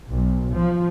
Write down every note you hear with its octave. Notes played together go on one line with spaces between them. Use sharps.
B1
F3